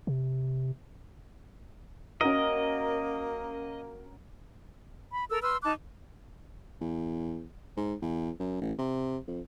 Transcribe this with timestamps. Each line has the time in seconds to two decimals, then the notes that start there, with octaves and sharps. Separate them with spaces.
0.07 C3
2.21 A#3 C#4 F#4 A#4 D#5
5.12 B5
5.30 A4 A#4 E6
5.42 B4 C6 E6 F6
5.63 D#4 A5 D6 F#6
6.81 E2
7.77 G#2
8.02 E2
8.40 F#2
8.61 A1
8.78 C3
9.28 F2